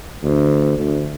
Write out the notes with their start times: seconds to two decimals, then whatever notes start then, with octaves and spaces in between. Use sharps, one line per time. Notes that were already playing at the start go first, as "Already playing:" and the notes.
0.23 D2
0.77 D2